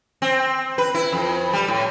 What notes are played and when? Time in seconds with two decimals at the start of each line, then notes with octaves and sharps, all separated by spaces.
0.22 C4
0.78 B4
0.95 E4
1.12 F2
1.53 G3
1.68 A2